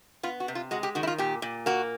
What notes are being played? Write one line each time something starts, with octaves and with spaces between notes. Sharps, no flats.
B3 F4
F#4
C3
F4
G#3 F#4
G4
D#3 F#4
E4
F4
A#2 G4
A#2
A#3 F#4